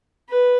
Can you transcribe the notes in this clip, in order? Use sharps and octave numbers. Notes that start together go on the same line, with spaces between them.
B4